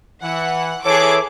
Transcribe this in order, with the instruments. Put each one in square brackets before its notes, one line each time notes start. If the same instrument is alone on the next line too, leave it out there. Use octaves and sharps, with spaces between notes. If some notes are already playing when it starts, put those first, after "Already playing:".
[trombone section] E3 [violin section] F#5
[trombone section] E3 A4 [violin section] G#4 D6 [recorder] C#5